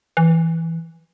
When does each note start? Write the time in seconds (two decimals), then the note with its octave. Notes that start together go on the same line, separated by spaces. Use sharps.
0.17 E3